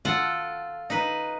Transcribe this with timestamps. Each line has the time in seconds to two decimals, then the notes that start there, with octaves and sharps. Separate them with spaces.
0.05 F4 A4 F#5
0.90 D#4 B4